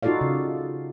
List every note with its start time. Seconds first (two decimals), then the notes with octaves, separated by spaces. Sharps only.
0.03 D#4 F4 F#4 A4 D5 F5
0.21 C#3